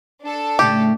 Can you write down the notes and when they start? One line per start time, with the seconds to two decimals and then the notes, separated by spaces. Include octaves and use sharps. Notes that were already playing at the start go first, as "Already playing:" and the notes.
0.22 D4 A4
0.59 A2 C#3 A3 G4